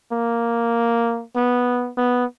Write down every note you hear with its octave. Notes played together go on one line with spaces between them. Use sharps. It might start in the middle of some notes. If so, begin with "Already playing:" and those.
A#3
B3
B3